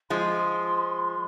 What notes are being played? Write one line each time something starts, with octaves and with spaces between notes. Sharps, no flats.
F3 G#3 C6